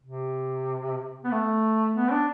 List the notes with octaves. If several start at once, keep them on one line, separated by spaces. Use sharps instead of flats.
C3
B3
A3
B3
D4